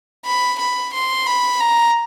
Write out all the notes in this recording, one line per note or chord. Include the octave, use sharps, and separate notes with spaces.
B5
B5
C6
B5
A#5